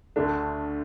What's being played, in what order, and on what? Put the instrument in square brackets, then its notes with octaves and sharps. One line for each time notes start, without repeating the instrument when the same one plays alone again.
[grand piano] D2 D3 A3 D4